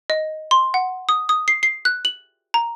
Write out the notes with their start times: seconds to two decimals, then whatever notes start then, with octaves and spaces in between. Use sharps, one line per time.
0.10 D#5
0.51 C6
0.74 F#5
1.09 D#6
1.29 D#6
1.48 C7
1.63 C7
1.85 F#6
2.05 F#7
2.54 A#5